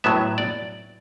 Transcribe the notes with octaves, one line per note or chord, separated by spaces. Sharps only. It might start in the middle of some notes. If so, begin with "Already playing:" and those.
A2 F#3 B3 E5
D5